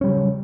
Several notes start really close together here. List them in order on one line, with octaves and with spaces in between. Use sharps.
C#4 G3 C#3 F#3